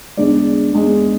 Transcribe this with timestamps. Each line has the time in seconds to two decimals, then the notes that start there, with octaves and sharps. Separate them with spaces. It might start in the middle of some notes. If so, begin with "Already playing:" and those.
0.17 E2 D3 G#3 D5
0.72 E2 D3 G#3